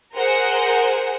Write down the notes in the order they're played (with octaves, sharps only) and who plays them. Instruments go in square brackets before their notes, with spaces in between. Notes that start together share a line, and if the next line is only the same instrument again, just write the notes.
[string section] G#4 A#4 C5 F#5